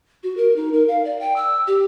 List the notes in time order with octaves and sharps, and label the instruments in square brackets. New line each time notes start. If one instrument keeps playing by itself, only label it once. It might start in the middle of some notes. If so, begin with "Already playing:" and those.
[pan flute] F#4
A#4
D#4
A#4
F5
D5
G5
E6
G4